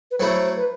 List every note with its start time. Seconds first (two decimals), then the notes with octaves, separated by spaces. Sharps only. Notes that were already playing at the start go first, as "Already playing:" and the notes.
0.11 B4
0.18 F#3 A3 E4 C5
0.56 B4